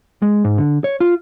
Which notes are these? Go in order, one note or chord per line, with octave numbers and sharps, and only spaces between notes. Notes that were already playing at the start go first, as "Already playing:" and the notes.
G#3
G#2
D3
C#5
F4